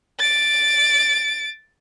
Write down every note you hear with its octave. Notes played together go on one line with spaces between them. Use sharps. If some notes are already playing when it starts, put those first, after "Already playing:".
A6 D7